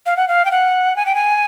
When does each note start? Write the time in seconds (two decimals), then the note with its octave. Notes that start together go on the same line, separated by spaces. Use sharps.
0.06 F5
0.17 F#5
0.28 F5
0.45 G5
0.51 F#5
0.96 G#5
1.06 G5
1.15 G#5